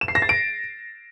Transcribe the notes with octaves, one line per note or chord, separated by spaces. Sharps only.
E7
C7
A#6
A6
D7